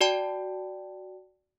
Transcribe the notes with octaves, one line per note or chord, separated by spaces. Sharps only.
F#4 D5 G5 A5